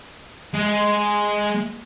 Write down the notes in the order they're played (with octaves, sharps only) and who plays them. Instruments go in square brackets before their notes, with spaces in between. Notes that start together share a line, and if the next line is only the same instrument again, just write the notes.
[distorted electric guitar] G#3